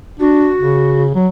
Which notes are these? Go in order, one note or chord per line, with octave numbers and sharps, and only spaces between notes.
D4 F#4
C#3
F#3